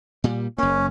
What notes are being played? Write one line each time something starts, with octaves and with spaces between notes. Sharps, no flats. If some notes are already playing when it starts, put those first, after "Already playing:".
A#2 G3
F#1 A#3 C#4